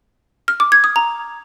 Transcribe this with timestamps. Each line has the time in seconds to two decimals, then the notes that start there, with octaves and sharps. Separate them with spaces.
0.48 F6
0.60 D6
0.72 G#6
0.84 D#6
0.96 A#5